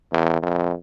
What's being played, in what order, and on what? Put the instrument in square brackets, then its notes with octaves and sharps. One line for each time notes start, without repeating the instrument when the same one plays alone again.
[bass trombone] E2
F2